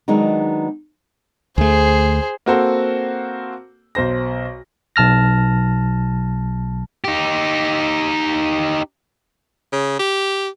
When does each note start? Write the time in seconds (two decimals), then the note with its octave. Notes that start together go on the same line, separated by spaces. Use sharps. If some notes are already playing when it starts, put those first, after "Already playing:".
0.08 D#3 F#3 G#3 B3 D4 D#4
1.58 D2 A3 G#4 C5
2.46 A#3 C4 F#4 A4 C5
3.95 B1 C5 A#6
4.96 B1 A5 F6 A#6
7.04 D#4 G4
9.72 C#3
9.99 G4